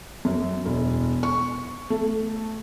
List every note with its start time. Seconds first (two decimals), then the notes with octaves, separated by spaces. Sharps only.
0.25 F#2
0.66 E1
1.23 C#6
1.90 A3